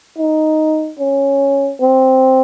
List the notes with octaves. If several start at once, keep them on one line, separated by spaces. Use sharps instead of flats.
D#4
C#4
C4